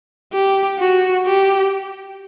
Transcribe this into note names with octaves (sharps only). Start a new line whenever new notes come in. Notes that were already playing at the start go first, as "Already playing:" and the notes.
G4
F#4
G4